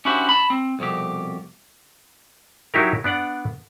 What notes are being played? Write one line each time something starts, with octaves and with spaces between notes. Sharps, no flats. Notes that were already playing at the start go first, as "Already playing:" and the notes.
C#4 D4 E4 F#4 G4 C5
A5 B5
C4
C2 F2 B2 G4
F#3 D#4 E4 G4 A#4
B3 D4 D5 F#5